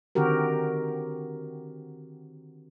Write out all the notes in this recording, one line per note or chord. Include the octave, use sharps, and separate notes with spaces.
D3 D#3 C4 F#4 G4 A#4